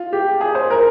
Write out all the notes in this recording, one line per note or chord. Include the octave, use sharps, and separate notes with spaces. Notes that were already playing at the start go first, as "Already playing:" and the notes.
Already playing: F4
G4
G#4
C5
A#4